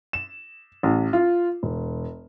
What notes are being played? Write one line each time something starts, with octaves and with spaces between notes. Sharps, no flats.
E7
A1
F4
E1